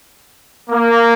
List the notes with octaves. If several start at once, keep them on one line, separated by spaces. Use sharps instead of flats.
A#3